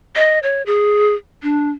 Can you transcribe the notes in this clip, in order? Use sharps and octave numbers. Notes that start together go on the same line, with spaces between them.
D#5
C#5
G#4
D4